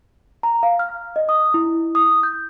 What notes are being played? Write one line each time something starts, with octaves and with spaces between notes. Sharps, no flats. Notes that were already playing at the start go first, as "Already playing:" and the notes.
A#5
F5
F6
D#5
D#6
E4
D#6
G6